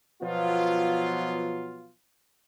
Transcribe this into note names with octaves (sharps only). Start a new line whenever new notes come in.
B2 F3 F#3 B3 F4